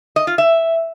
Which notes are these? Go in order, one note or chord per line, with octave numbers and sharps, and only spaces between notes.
D#5
F4
E5